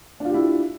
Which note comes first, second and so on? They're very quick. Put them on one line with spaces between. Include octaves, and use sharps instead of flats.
D4 F4 G4 E4